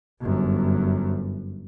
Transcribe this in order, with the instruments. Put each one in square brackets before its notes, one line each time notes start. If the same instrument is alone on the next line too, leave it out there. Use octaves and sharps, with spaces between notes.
[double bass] G1 F#2